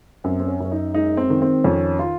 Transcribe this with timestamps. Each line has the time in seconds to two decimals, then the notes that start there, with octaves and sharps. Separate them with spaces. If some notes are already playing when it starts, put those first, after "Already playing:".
0.24 F#2 C4
0.40 C4
0.47 C#4
0.60 F#2
0.65 C#4
0.72 D#4
0.94 G#3 D#4
1.17 C4
1.30 D#3
1.42 C4
1.64 F2 C#4
1.99 F4